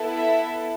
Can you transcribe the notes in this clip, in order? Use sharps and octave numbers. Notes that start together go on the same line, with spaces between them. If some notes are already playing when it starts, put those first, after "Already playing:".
Already playing: B3 E4 A4
E5